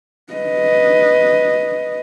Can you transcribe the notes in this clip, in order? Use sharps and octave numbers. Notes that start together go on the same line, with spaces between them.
B4 D#5